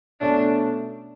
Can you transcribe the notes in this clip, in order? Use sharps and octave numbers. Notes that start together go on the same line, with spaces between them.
B2 A3 C#4 D4